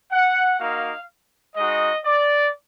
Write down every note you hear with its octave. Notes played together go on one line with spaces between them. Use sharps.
F#5
A#3 D#4 F#4 F5
G#3 D#4 F#4 D#5
D5